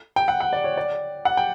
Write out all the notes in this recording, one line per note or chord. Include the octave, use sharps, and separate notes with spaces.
G5
F#5
F#5
D5
C#5
D5
F#5
G5